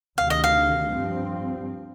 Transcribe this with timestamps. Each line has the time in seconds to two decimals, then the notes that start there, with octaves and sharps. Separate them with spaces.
0.18 D2 C3 D#3 F5
0.30 D#5
0.44 F5
0.90 G2 F3 C4